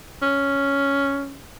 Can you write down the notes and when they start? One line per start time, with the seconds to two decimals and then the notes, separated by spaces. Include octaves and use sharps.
0.22 C#4